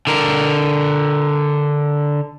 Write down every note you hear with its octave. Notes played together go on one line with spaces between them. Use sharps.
D3 A#4